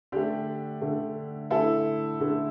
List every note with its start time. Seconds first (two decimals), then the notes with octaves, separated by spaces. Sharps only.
0.12 D3 A3 D4 G4
0.82 D3 A3
1.50 D3 A3 E4 A4
2.20 D3 A3